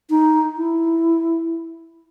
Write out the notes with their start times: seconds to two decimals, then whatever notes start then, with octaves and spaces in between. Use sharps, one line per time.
0.10 D#4
0.57 E4